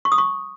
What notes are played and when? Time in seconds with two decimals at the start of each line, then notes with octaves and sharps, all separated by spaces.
0.05 C#6
0.12 D#6
0.18 C#6